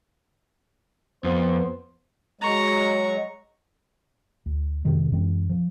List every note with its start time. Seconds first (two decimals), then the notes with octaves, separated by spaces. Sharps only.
1.24 F2 B3 C5
2.41 F#3 G#3 A#5 C#6
4.46 D2
4.85 F2 C3 D#3 G#3
5.12 F#2 E3 G#3 C4
5.50 F3